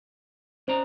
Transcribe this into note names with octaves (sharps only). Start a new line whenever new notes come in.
C#4 C5 D5 A#5